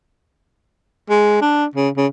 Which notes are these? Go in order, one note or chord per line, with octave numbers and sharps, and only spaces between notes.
G#3
D4
C#3
C#3